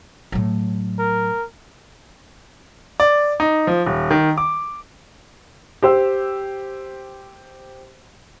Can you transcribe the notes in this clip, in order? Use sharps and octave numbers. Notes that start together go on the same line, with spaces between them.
A2 F#3
A#4
D5
D#4
F3
D#1
D#3
D6
G4 C5 E6